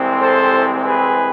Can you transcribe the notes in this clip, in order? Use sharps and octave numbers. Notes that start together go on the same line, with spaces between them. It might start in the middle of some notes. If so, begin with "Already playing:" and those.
Already playing: C2 C3 E3 G#3 C4
A4 C5
G#4 B4